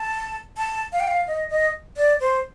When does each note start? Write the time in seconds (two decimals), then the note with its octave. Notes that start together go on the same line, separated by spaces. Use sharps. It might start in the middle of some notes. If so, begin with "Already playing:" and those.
Already playing: A5
0.57 A5
0.92 F5
1.00 G5
1.08 F5
1.27 D#5
1.50 D#5
1.97 D5
2.20 C5